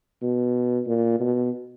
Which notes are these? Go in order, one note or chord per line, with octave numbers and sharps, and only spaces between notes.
B2
A#2
B2